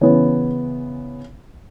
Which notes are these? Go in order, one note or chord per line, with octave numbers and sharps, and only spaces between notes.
C#3 E3 B3 C#5